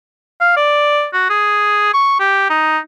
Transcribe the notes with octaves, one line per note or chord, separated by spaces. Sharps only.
F5
D5
F#4
G#4
C#6
G4
D#4